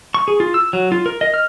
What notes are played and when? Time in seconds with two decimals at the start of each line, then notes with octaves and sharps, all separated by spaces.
0.14 C#6
0.28 G#4
0.40 F4
0.54 E6
0.73 F#3
0.92 F4
1.06 A#4
1.21 D#5
1.34 F6